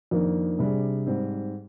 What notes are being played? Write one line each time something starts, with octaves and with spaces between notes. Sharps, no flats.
F2 D#3 A#3 D4
C3 G3 D4 G#4
G#2 G3 C4